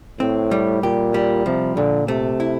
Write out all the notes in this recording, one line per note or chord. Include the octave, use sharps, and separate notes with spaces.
A2 C4
G3
A#2 G4
G3
C3 F3
A#2 D3
C3 A3
E4